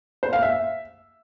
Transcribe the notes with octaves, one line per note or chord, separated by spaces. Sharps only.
C5
F5
E5